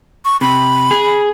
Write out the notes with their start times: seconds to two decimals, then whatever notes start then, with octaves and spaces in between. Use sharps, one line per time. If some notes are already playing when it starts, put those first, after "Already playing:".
0.25 C#6
0.41 C3 B5
0.91 G#4